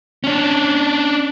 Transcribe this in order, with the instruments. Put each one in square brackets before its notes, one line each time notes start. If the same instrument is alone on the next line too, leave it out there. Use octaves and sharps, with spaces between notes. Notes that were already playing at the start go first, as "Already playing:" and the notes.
[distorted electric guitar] C#4 D4